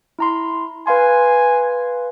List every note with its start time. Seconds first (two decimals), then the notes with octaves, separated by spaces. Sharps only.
0.19 E4 A#5 C6
0.87 B4 F5 G#5 C6